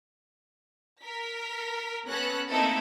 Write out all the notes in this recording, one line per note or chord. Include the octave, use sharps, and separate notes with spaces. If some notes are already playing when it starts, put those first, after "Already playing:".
A#4 B6
B3 C#4 A4 B4 F#6 A#6
A3 A#3 C4 D#4 E4 A4